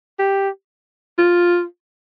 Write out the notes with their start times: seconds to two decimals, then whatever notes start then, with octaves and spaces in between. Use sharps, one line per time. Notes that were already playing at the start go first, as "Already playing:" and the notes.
0.19 G4
1.19 F4